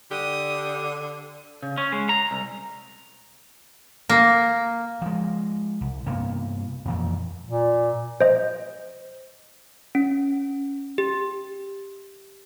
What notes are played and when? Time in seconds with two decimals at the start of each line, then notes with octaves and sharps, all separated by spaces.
0.11 D3 G4 D#6
1.63 C#3
1.78 C#4
1.92 G#3
2.09 A#5
2.31 C2
4.09 A#3
5.02 F3 G#3
5.81 C2
6.06 G2 C3 A#3 B3
6.85 F2 A#2 E3 F3
7.47 A#2
8.21 C5 D#5
9.95 C#4
10.98 G4